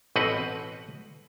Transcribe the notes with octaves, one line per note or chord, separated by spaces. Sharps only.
A1 B2 C4 B4 D#5 F#5